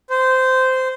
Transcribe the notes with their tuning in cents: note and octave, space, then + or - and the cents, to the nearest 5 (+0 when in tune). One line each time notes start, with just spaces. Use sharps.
C5 -15